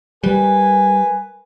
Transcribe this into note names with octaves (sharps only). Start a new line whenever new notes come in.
G3 A#4 B4 G#5